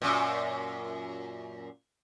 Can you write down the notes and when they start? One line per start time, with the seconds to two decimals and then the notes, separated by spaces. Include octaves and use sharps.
0.02 F#2 A#2